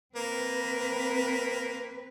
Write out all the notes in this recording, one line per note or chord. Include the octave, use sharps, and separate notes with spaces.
A#3 C4 B4